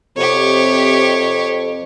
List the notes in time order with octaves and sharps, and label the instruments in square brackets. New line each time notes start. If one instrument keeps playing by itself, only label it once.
[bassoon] F2 [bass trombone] C3 [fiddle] G4 C#5